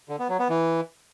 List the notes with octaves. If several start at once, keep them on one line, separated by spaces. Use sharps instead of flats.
D3
B3
F#3
B3
E3